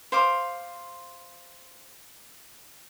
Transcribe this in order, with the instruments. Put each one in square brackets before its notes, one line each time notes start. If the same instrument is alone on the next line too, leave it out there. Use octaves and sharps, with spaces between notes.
[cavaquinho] C5 F5 D6